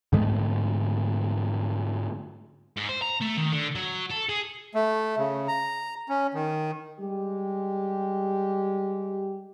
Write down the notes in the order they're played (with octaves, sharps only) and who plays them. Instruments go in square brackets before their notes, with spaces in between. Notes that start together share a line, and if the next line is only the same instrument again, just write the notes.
[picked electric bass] G#2 D3 G#3 A3
[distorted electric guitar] G#2
C5
A#5
A3
D#3
D3
F#3
A4
G#4
[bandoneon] A3
C#3
A#5
C#4
D#3
[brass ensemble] G3 G#3 G4